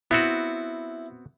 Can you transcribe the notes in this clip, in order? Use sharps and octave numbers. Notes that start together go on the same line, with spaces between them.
B3 C4 E4 F#4